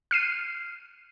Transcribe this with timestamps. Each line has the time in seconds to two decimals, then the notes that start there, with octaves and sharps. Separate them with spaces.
0.11 F6 C7 D#7